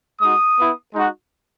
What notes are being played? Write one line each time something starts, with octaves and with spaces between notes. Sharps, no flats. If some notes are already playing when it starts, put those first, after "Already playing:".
G#3 D#4 F#4 D#6
B3 E4
G#3 D#4 F#4